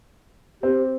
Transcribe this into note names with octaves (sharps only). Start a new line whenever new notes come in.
C4 G4